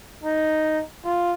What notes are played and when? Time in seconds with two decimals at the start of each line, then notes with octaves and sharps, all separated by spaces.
0.24 D#4
1.05 F4